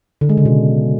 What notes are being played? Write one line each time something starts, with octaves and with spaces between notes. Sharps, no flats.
D3
G#3
C#3
B2